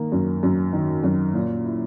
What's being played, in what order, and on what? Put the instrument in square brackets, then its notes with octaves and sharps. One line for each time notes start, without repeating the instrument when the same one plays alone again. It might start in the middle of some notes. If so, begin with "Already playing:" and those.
Already playing: [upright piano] D#3 A#3
F#2
F#2
D#3
F#2
A#2
E4